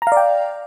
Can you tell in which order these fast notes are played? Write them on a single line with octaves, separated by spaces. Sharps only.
A#5 F5 D5 G5